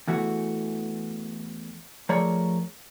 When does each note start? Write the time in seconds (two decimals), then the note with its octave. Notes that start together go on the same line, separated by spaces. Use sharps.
0.07 E2 E3 A3 F#4
2.09 F3 A3 G#4 A#4 C#5 D5